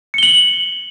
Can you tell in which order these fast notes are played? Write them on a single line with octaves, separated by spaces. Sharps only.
C#7 G7 F#7